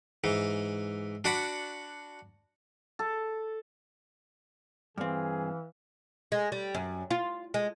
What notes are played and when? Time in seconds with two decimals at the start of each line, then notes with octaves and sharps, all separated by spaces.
0.24 G#2 E3
1.24 D4 F#4 D5 F#5 B5
2.99 A4
4.98 G2 E3 C4 G#4 F5 F6
6.32 G#3
6.52 G3
6.75 F#2
7.10 F4
7.54 G#3